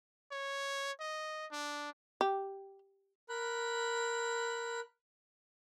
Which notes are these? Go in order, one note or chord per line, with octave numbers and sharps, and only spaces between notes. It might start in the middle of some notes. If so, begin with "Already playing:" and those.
C#5
D#5
D4
G4
A#4 B5 F#6